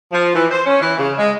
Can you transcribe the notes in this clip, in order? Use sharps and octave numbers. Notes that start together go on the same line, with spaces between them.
F3
E3
C5
C#4
E3
C#3
G#3